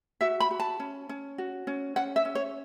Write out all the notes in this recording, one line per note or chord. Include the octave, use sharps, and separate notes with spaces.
F#4 E5
B5
F#4
A5
C#4
C#4
F#4
C#4
C#4 F#5
E5
C#4
C#5